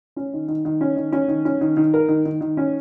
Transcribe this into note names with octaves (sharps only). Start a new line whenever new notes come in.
C#4
D#3
D#3
D#3
C#4
D#3
C#4
D#3
C#4
D#3
D#3
A#4
D#3
D#3
D#3
C#4